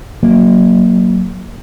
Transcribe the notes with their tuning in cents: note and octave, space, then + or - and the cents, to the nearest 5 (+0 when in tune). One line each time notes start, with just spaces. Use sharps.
F#3 +0 A#3 +0